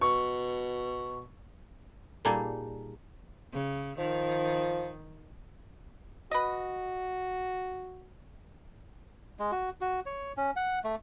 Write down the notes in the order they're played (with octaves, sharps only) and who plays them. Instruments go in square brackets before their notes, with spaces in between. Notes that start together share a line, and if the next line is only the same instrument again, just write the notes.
[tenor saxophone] B2 [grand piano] C#6
[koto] A#2 G3 A#3 D#4 G#4 A4
[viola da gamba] C#3
[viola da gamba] D#3 [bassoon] F3
[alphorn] F#4 [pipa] B4 D#5
[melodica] G#3
F#4
F#4
C#5
C#4
F#5
A3